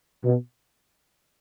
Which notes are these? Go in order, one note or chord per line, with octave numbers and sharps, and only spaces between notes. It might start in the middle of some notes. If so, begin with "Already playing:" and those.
B2